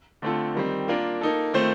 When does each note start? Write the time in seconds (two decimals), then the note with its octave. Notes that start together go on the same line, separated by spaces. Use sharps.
0.22 D3 A3 C4 F4 A4
0.55 D#3 G3 C4
0.88 A#3 D4 F4 A#4
1.21 A#3 D#4 A4
1.53 D#3 A3 C4 F4 C5